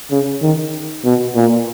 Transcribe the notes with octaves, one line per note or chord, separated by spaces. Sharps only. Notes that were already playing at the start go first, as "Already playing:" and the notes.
C#3
D#3
B2
A#2